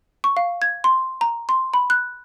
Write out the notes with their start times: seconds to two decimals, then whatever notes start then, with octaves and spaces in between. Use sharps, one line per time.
0.24 C#6
0.37 F5
0.62 G#6
0.84 C6
1.21 A#5
1.49 C6
1.74 B5
1.90 F#6